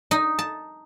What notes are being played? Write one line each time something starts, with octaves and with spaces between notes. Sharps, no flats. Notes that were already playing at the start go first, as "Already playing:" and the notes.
D#4
A5